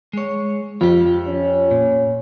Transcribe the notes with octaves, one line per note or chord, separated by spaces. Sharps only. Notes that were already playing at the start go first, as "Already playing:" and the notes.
G#3 C#5
F2 F4 G4
C#4
A#2